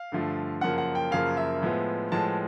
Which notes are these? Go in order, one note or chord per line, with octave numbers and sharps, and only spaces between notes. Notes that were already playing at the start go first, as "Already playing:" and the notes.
Already playing: F5
G2 D3 F3 A3
F#2 C#3 F3 A#3 F#5
F#5
G5
F#2 C#3 F3 A#3 F5
E5
A2 F3 G#3 B3
A2 F3 G#3 B3 A5